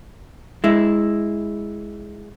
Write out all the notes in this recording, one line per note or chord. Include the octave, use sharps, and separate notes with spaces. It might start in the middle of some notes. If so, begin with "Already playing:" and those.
G#3 E4